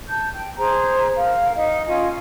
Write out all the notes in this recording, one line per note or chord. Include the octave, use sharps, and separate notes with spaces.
A5 G6
G5
G#4 C5 A#5
A#4 F5
D#4 D#5
C#4 F4 D#5 G#5